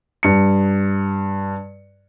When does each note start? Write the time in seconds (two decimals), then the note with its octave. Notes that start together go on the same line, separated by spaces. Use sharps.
0.23 G2 C#7